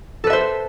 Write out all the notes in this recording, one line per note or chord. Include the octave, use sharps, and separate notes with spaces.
A4 B4 C5 E5